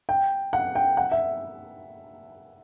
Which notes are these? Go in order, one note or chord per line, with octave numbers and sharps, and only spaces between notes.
G5
F#5
G5
F#5
E5